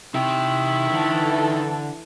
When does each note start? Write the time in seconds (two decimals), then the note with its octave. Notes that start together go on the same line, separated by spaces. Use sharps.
0.15 C3 D#4 E4 G5
0.91 D3 E3 A4